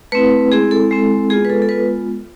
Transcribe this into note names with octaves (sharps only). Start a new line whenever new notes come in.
A3 C4 E4 B4
G#3 C4 E4 G#4
A4
G#3 C4 E4
G#3 B3 F4 G#4
B4
A4
A4
G#3 B3 F4 B4